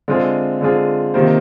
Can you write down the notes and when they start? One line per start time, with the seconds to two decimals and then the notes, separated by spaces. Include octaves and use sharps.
0.08 D3 G#3 C4 F4 G#4
0.61 D3 G#3 C4 F4 G#4
1.14 C3 D#3 A#3 F4 C5